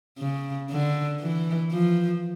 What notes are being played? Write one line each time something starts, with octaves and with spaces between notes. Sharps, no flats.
C#3
D3
E3
F3